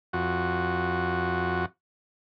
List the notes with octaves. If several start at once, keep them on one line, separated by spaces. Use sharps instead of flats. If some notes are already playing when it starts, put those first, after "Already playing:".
F2 F#4